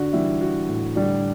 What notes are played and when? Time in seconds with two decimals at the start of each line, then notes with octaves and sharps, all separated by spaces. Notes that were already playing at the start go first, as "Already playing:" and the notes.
Already playing: D3 D4 F#4
0.13 E3 G3 E4
0.41 F#4
0.69 A2
0.96 D3 G3 D4